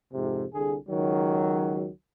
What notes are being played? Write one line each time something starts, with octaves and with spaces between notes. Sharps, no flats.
F2 G#2 C3
C2 D3 G#4
C#2 D#3 F#3